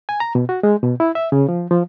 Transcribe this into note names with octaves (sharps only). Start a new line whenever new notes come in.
G#5
A#5
B2
F#4
G#3
B2
E4
E5
C#3
F3
F3